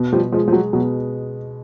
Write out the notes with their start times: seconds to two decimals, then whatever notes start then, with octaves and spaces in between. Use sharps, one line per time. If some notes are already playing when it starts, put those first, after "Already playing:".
Already playing: B2
0.13 F3 G3
0.32 F3 G#3
0.48 F3
0.53 F#3
0.73 B2 F#3